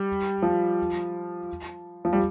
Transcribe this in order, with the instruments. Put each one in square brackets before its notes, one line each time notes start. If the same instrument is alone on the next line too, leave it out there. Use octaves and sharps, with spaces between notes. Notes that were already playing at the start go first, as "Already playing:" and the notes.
Already playing: [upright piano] G3
F3
F3
G3